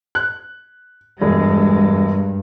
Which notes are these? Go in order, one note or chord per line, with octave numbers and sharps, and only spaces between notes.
F#6
E1 G2 G#3